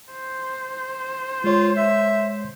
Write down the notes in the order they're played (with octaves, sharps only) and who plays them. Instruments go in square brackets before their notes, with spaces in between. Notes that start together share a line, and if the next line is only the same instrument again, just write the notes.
[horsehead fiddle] C5
[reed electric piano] G#3 C#5 [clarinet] F4
[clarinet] E5